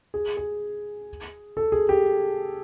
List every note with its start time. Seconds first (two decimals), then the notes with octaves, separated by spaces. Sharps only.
0.14 G#4
0.37 G#4
1.57 A4
1.72 G#4
1.89 G4